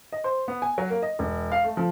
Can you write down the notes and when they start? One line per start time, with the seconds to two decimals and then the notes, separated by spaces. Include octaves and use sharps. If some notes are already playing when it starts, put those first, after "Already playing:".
0.12 D#5
0.24 C5
0.48 B3
0.62 G#5
0.78 F#3
0.90 A#3
1.03 D#5
1.19 E1
1.52 F5
1.64 A3
1.77 F3